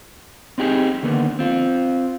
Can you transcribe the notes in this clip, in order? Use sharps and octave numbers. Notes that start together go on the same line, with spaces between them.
C4 D#4 G4 G#4
D3 D#3 A#3 B3
C4 F4